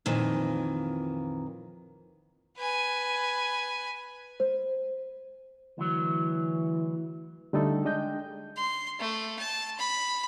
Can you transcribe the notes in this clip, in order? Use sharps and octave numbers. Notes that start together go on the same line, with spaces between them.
F2 A#2 D#3 E3
B4 G#5
C5
D2 E3 F#3
D3 G3 A3 D#4 A4
G#3 D4 D#5 G5 G6
C6
A3
A5
B5